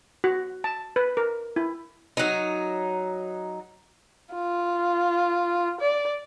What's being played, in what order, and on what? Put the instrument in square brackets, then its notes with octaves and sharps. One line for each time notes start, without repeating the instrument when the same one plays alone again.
[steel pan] F#4
A5
B4
A#4
E4
[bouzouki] F#3 D#4
[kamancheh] F4
D5